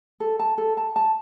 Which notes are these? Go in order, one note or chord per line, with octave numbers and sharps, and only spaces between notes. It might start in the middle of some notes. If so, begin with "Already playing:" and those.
A4
A5
A4
A5
A5